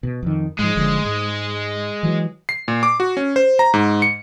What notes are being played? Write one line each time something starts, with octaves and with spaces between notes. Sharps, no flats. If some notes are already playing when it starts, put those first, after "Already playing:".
B2
F2 D#3
G#2 F3 G#3
F#1 D3 F3
G#2
E3 F#3
C7
A#2
D6
F#4
C#4
C5
A#5
G#2
C#7